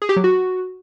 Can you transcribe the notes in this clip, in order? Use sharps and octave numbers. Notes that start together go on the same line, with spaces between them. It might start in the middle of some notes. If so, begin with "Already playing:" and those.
G#4
G4
F#3
F#4